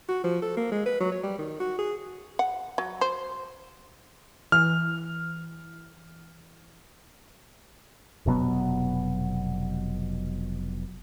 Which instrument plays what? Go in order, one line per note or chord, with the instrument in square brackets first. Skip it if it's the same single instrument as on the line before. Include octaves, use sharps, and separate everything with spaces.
[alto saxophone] F#4
F3
A4
A#3
G#3
B4
F#3
C#5
G3
D#3
F#4
G#4
[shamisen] F#5
F#3
C5
[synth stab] E3 [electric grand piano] F6
[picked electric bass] F1 B2 F#3 B3